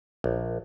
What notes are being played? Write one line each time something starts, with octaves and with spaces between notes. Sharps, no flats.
A#1